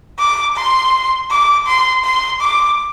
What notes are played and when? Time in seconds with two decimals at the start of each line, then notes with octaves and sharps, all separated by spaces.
0.19 D6
0.56 C6
1.30 D6
1.67 C6
2.04 C6
2.41 D6